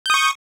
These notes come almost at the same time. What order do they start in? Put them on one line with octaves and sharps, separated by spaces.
G6 D#6 C#6